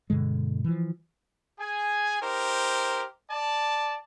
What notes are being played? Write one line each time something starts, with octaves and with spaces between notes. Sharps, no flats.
G2 B2 D3 G#3
E3 F3
G#4 G#5
D#4 G4 A#4 C5
D5 A5